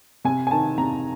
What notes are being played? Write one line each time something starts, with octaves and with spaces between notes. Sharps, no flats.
C3 G#5
G#5
D#3 A5
C3 A#5